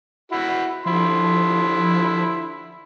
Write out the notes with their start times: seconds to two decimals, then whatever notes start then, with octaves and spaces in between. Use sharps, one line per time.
0.32 E4 F#4
0.86 D3 F3 E4 C6